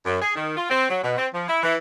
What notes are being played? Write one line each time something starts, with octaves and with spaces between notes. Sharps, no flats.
F#2
G#4
D#3
F4
C4
F#3
B2
C4
F3
E4
E3